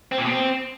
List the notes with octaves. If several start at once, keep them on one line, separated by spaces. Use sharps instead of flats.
C4
A#2
B2
C4